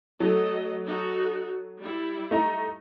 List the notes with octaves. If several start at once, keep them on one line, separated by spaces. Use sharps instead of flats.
F#3 A3 A4 D#5
D#4 F#4 A4
G3 E4
A3 D#4 A#5